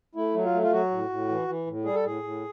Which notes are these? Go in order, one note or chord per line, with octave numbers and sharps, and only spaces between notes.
A3 E4
F#3
F4
A3
F4
F#3 F#4
A2
A2
E3
E3
A2
G3 G#4
A4
A2 G#4
A2